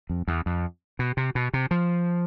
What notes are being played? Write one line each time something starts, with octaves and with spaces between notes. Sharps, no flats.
F2
E2
F2
B2
C3
B2
C3
F3